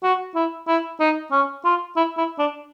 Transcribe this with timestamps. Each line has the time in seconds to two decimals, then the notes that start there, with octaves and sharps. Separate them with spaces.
0.03 F#4
0.35 E4
0.67 E4
0.99 D#4
1.31 C#4
1.64 F4
1.96 E4
2.17 E4
2.38 D4